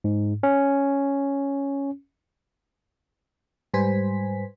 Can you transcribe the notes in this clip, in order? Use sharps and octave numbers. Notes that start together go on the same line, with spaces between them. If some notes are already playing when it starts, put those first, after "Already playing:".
G#2
C#4
G#2 G3 B4 C5 G#5 B6